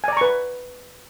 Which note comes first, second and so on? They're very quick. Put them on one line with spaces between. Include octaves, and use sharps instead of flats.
G#5 D5 A#5 C#6 B4